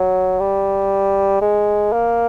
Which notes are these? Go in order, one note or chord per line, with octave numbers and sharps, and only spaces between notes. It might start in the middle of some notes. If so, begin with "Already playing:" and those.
Already playing: F#3
G3
G#3
A#3